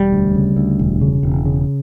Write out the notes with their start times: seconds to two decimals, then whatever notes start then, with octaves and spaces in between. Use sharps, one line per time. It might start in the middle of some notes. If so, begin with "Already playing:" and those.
Already playing: E1 G3
0.12 D2
0.35 C#3
0.57 D2
0.79 E1
1.01 C#3
1.23 E1
1.45 C#3